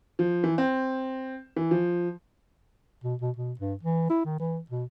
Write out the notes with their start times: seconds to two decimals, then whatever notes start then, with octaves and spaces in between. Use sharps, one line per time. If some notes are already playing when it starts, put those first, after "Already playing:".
0.19 F3
0.44 E3
0.58 C4
1.56 E3
1.71 F3
3.04 B2
3.21 B2
3.37 B2
3.59 G2
3.83 E3
4.10 E4
4.25 D#3
4.40 E3
4.70 B2